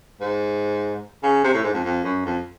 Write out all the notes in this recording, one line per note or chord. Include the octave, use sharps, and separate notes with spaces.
G#2
C#3
C3
A2
G#2
F2
F2
F#2
F2